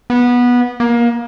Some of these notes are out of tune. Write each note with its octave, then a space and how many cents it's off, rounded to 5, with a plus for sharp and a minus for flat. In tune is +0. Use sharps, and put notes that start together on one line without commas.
B3 -15
A#3 +25